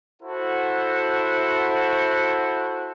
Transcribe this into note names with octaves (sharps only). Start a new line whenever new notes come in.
E4 F#4 A4 C5 F#5